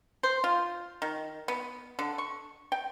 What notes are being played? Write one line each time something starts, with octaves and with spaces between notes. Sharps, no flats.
C5
F4
D#3
B3
D3
C#6
G5